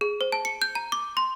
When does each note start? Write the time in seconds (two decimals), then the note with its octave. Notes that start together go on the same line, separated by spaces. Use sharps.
0.01 G#4
0.21 C5
0.32 A5
0.45 C#7
0.62 G6
0.75 A#5
0.92 D6
1.17 C6